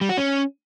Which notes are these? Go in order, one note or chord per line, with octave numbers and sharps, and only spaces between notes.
G3
F#4
C#4